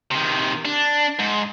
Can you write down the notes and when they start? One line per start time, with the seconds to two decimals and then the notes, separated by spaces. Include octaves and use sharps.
0.11 C3 D#3
0.65 D4
1.19 G#2